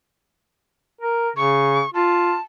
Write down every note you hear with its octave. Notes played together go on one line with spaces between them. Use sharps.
A#4
C#3 C#6
F4 A5